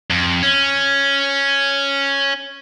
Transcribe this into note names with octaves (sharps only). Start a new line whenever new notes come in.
F2
C#4